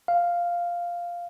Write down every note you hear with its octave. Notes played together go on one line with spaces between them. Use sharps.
F5